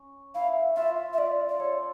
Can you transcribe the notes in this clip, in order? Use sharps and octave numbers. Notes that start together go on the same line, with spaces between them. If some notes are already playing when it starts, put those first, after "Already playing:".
Already playing: C#4
E4 F5
F4 E5
E5
F4 D5
D5
A4 C#5